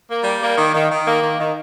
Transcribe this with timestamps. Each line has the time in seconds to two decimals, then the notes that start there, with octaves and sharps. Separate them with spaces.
0.08 A#3
0.24 G3
0.40 A#3
0.57 D#3
0.73 D#3
0.90 D#3
1.06 A#3
1.22 D#3
1.39 D#3